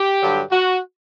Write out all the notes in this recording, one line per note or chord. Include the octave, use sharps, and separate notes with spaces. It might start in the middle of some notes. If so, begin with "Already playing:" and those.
Already playing: G4
G2 D3 F#3
F#4